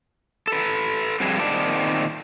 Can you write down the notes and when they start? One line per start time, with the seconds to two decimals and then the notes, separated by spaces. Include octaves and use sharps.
0.47 A4 B4
1.20 F2 G3 C4 D4 G#4 G#5
1.39 A#2 D#3 C4 G#4 D5 A5